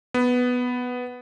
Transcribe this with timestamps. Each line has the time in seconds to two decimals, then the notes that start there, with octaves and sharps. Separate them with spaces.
0.14 B3